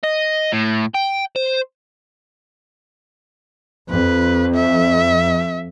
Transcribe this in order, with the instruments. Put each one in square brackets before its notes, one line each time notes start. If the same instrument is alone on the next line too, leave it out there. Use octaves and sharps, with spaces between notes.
[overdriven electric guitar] D#5
A2
G5
C5
[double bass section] F2 [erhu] B4
[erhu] E5